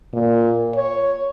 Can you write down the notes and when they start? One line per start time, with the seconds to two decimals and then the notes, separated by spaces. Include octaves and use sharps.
0.13 A#2
0.76 C#5